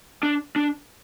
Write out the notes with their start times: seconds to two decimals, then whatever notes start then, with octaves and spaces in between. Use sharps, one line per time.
0.23 D4
0.56 D4